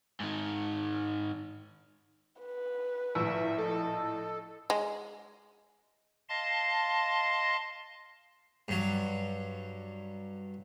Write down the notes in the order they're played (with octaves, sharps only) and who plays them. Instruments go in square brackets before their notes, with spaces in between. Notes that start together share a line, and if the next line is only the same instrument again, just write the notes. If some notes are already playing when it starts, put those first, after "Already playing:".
[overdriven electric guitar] G#2 D#3
[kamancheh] B4
[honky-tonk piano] A#1 A2 [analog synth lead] E5
[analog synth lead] A4 [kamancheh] D#5
[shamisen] G#3
[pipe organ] D#5 F5 A5 C6
[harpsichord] G2 F#3